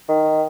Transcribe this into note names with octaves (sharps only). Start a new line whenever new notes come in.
D#3